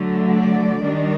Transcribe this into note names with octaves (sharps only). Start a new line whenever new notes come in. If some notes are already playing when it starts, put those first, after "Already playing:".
Already playing: D3 F#3 A3
D5
D#3 G3 D4